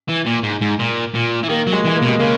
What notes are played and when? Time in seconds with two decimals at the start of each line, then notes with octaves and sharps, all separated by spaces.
0.09 E3
0.26 A#2
0.43 G#2
0.61 G#2
0.79 A#2
1.14 A#2
1.43 E3
1.49 D#3 A#3
1.67 F#3
1.73 G#3
1.85 E3 G#3
1.96 A#3
2.02 B2
2.08 G#3
2.19 C#3 A#3